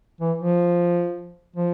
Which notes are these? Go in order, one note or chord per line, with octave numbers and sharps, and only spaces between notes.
E3
F3
F3